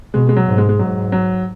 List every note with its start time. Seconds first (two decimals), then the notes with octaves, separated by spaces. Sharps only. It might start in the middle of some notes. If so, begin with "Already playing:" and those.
0.14 B2 G#3
0.29 G#3
0.36 F#3
0.47 G#2
0.58 G#3
0.69 G#3
0.79 G#2 F#3
1.12 F#3